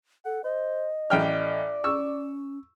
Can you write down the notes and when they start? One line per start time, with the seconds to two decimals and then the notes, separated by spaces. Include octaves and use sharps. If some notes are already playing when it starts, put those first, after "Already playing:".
0.25 A4 F#5
0.44 C5 D#5
1.10 A1 D5 G5 F6
1.84 C#4 C#6 E6